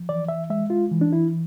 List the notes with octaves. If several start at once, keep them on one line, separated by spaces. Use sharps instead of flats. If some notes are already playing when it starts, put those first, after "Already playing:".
Already playing: F3
E3 D5
E5
G#3 E5
F4
E3
D4
E4